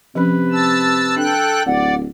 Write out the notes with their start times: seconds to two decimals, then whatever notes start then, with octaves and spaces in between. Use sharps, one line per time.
0.15 C3 F3 C#4 B4
0.52 A5 E6
1.17 D4 A4 G5 F#6
1.66 D1 D5 F#5